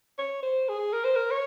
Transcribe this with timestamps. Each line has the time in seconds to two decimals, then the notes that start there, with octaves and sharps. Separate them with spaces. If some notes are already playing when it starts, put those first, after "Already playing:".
0.18 C#5
0.43 C5
0.69 G#4
0.93 A#4
1.04 C5
1.16 A#4
1.31 C#5